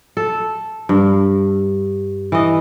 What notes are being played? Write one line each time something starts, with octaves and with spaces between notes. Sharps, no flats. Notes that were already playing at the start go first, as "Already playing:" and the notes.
A4
G2
E3 D#5